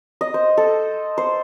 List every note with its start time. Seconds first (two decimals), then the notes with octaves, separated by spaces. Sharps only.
0.21 D#5
0.34 C5
0.57 A4
1.18 C5